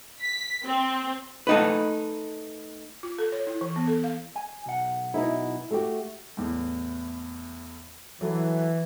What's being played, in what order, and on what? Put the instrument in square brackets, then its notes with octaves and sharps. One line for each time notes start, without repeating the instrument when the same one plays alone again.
[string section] B6
C4
[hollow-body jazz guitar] A3 D#4 B4
[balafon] F4
A4
C#5
E4
E3
B3
A4
F5
[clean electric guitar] G#5
B1 F#5
[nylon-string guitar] B2 D#4 E4
A3 F#4 G4
[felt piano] E2 A2
[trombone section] E3 [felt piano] F#3 A4